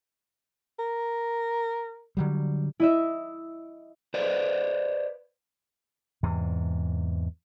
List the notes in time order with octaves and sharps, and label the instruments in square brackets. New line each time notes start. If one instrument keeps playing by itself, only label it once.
[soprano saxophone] A#4
[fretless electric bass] D3 F#3 G3
[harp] E4 D#5 E5
[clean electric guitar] B4 C5 D5 D#5
[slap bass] E2 G#2 C3